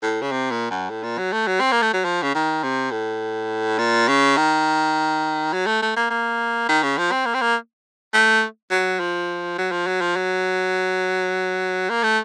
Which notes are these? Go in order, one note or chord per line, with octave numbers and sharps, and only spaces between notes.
A2
C#3
C3
A#2
F#2
A2
A#2
F#3
A3
F#3
C4
A#3
A3
F#3
F3
C#3
D#3
C3
A2
A#2
C#3
D#3
F#3
A3
A3
A#3
A#3
D#3
C#3
F3
C4
A#3
C4
A#3
A3
F#3
F3
F#3
F3
F#3
F3
F#3
A#3
A3